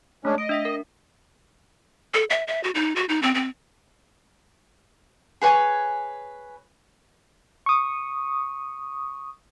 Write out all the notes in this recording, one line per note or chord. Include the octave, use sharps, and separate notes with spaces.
G#3 A3 C#4 D4
D#5 D7
D4 E5 B6
A#4
A4
E5
E5
F#4
D#4
F#4
D#4
C4
C4
G#4 B4 C#5 G#5
C#6 D#6